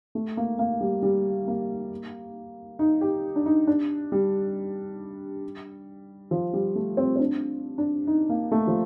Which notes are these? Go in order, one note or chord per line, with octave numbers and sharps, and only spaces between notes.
A3
A#3
A#3
G3
G3
A#3
D#4
G4
D4
D#4
D4
G3
F3
G3
A3
C4
C4
D4
D4
D#4
A#3
A3
F3